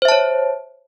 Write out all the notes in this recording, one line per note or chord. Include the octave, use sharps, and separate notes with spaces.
C5 C#5 E5 A5